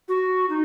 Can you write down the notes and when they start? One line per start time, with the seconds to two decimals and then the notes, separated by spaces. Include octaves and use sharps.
0.08 F#4
0.50 D#4